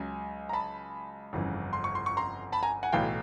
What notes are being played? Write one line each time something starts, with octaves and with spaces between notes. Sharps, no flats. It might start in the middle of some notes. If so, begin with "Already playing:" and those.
Already playing: C#2 C#3 F#3 G#5
A#5
A5 B5
G1 F2 C#3 E3
C6
C#6
C6
C#6
A#5 C6
A5 B5
G#5 A#5
F#5 G#5
B1 A2 E3 F5 G5